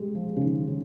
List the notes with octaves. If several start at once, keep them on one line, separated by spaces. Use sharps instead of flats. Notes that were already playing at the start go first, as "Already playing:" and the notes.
Already playing: G3 G#3
F3
C#3
D#3
C#3